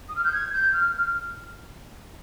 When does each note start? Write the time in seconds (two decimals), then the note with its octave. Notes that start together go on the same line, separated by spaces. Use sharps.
0.09 D#6
0.16 F6
0.24 G6
0.33 G#6
0.53 G6
0.72 F6